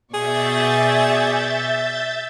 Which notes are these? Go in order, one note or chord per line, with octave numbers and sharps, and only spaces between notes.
B2 G#4 D5 E5 C#6 G6 A6